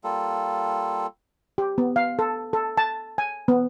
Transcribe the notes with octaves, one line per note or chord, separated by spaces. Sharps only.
G3 A#3 F4 A4
G4
B3
F5
A4
A4
A5
G#5
B3